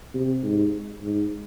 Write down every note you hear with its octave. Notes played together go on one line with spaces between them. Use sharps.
C3
G#2
G#2